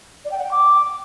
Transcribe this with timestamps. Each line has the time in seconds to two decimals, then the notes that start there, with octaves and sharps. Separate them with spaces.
0.24 D5
0.31 G5
0.38 F#5
0.44 G5
0.51 D6